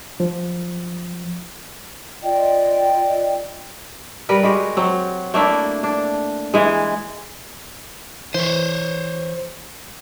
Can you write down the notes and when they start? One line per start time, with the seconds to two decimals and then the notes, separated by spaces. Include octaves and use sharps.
0.20 F3
2.23 F4 D5 D#5 G5
4.29 G3 A#4 B4
4.43 G#3 F#4 G4
4.77 F#3 C4
5.34 A3 A#3 D4 E4
5.84 D4
6.54 E3 G#3
8.34 E3 C5 C#5